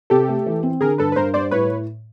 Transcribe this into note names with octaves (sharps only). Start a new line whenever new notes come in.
C3 G4 A4
A3
E3
C4
D3 G#4 A#4
G2 A4 B4
B4
G2 A#4 C5
G3 C5 D5
A2 B4 C#5